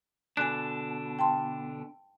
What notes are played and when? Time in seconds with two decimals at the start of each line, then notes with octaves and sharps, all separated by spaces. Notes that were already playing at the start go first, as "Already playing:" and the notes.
0.37 B2 D3 D4 G#5 F#6
1.19 G5 A5 C6